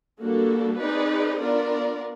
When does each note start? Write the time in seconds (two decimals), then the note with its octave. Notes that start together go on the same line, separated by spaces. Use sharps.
0.21 G3 A#3 D4 F#4 A4
0.81 C4 D#4 G#4 B4 D5
1.40 B3 D4 F4 A#4 D5